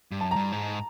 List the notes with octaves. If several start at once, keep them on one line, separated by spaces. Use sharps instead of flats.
G2
F#2 A5
G2 A#5
G#2